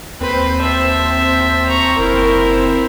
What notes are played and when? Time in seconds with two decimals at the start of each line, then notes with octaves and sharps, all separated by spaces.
0.20 D#2 C4 B4 C5
0.61 E5 A5
1.67 A#5 C#6
1.98 F#1 E4 A#4